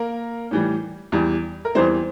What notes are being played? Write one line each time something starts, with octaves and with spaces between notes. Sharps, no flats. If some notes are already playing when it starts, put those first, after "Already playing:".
Already playing: A#3 A#4
A2 E3 G3
E2 E3 G3
A#4
E2 E3 G3 C4 C5